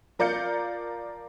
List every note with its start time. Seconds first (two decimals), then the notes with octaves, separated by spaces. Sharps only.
0.19 F3 A#4 D5 F5 G6 C#7